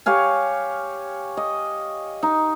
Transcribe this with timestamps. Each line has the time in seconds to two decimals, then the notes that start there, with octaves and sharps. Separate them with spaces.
0.06 G4 C#5 F5 G#5
1.37 D#5
2.23 D#4